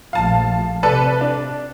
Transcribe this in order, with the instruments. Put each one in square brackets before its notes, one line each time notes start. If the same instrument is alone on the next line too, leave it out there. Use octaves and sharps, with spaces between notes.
[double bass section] A#1 F3 A3 [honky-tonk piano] F5 A5
[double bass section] C3 [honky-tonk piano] A4 B4 D5
[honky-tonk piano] D4